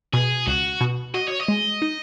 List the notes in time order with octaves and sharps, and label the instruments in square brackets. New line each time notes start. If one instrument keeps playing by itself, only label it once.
[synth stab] B2 [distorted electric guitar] G#4
[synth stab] C#2 [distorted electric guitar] F#4
[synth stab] B2
[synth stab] F#4 [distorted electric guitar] D#5
[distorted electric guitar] C#5
D#5
[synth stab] G#3
D#4